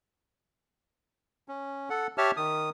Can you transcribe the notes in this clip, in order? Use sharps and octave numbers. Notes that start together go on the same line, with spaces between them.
C#4
A4 F#5
G4 C#5 E5 A5 F6
D#3 D#6